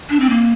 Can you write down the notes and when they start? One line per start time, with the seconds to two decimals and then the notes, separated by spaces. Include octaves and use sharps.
0.10 D4
0.20 C4
0.30 A#3